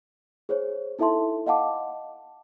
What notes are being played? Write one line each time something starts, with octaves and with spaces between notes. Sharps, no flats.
G#4 C5 C#5
D#4 E4 A4 E5 A5 C6
D#5 F5 F#5 A5 D6